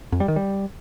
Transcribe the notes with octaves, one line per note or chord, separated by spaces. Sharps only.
F2
G3
D#3
G3